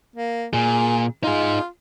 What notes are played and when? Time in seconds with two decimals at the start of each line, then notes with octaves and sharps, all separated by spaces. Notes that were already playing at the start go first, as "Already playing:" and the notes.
0.16 A#3
0.54 A#2 G#4
1.24 D#4 F4 G#4